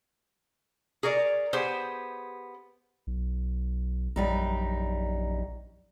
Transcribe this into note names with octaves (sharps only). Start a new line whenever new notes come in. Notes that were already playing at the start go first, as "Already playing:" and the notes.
G#4 A#4 C#5 D5
B3 G4 G#4 C5
B1
A#1 F#2 G3 D#4